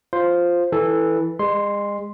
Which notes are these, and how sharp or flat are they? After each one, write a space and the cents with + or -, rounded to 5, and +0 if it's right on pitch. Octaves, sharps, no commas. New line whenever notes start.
F4 +0 C5 +0
E3 -10 A4 +0
G#3 -35 C6 +0